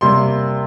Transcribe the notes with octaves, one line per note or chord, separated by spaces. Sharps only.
C3 G3 A#3 C6